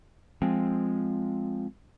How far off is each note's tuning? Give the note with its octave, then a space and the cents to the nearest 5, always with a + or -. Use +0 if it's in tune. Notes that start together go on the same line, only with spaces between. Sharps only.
F3 +0 G#3 +0 C4 +0